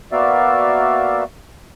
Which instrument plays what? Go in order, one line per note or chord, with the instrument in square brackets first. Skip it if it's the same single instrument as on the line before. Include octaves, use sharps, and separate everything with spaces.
[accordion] A#3 B3 F#4 D5 E5 F5